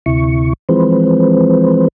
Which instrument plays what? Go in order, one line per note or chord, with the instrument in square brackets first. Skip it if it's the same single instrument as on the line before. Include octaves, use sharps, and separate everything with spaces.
[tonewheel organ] D2 C3 E4 C#6
E3 F3 G#3 C4 B4 C5